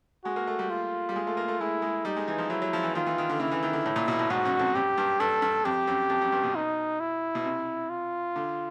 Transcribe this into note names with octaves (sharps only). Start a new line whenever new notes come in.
G#3 F#4
A#3
A3
G3
F4
G3
G#3
A3
A#3
A3
G#3 E4
G#3
G3 D#4
G#3
E3
F3
F#3 E4
F#3
F3
E3
D#3 F4
E3
D#3
D3
C#3 E4
E3
D#3
D3
A2
A#2
B2
A2
G#2 F#4
F#2
F2
F#2 G4
G2
G2 A4
G2
F2 G4
F#2
F2
F#2
G2
B2
D#4
E4
B2
C3
F4
D3